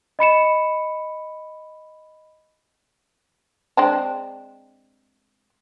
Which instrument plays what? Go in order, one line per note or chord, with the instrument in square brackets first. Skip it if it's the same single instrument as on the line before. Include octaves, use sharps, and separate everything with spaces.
[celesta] D#5 B5 C#7 E7
[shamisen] G#3 C4 D4